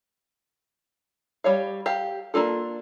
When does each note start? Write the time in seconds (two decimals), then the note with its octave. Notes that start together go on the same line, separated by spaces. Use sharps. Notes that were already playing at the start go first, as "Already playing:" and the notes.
1.44 G3 C#5 F5
1.86 G4 F5
2.34 A#3 D4 F4 A4